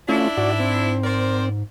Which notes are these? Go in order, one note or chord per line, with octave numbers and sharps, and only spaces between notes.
A3 C#4 D4 E4 F4
G#2 F#4 D5
C4
A#4 C5 D5